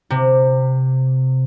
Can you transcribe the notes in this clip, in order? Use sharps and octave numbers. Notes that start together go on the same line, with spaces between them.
C3